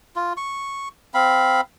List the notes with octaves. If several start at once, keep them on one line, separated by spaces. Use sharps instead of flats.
F4
C#6
C4 F5 B5